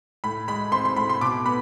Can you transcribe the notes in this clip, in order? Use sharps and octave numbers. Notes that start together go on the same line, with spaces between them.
A2 B5
G#3 B5
C4 C6
C6
A2 B5
C6
B2 D6
B3 B5